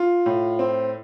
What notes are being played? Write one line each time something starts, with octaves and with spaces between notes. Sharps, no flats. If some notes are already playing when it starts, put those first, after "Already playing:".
Already playing: F4
A2
C4